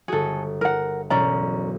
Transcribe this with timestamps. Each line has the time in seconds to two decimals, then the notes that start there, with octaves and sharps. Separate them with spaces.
0.08 G1 F#4 G#4 A4
0.61 A#4 F#5
1.10 E1 B1 C#4 D5 A#5